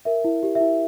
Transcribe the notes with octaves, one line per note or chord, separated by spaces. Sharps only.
A#4 E5
E4
G4
E5
E4